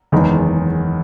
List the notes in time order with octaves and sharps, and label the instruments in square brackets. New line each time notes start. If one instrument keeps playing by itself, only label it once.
[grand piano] F#1 E2 D#3 G#3